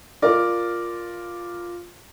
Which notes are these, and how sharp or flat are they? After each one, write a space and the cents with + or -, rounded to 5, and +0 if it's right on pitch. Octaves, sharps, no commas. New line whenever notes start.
F4 +0 A#4 +0 D5 +0